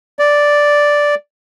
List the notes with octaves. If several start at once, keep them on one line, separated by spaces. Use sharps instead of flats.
D5